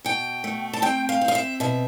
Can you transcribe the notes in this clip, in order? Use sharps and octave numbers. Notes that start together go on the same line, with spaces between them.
B2 G5
A3
A5
C4 G5
F5
C4
F5
E5
B2 E5